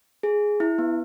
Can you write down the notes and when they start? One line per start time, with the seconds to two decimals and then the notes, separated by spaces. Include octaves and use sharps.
0.23 G#4
0.60 E4
0.78 B3